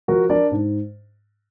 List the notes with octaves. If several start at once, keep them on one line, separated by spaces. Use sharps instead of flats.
F3 F#4 A#4
D4 A#4 D5
G#2